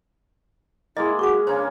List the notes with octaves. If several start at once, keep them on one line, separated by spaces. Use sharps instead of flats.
G#3 A#3 E4 G#4 D#5
F#4 G#4 C#6 D6
C#3 A#3 C#4 D4 C5